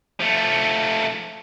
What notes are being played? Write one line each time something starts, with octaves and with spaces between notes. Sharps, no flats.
F3 A3